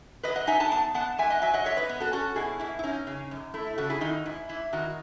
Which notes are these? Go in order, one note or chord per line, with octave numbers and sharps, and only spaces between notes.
F#3 B4 D#5
D#5 F#5
D#4 E5 G#5
F#5 A5
B3 A5
B3 F#5 A5
G#2 E5 G#5
D#5 F#5
F#3 E5 G#5
D#5 F#5
G#2 C#5 E5
B4 D#5
B3
F#4 A4
C#4 F#4 A4
B2 E4 G#4
B2 E4
E4
C#4 D#4
C#3
F#2
A3 E4
E4
C#3 F#4 A4
E4 G#4
D#3 D#4 F#4
G#2 E4
G#2 E4
D#3 D#4 F#4